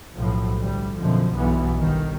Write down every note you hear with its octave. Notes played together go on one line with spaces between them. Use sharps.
B1 A2 F3
D2 G3
F#2 B2 D3 F3
B1 G2 E3 B3
G1 D#3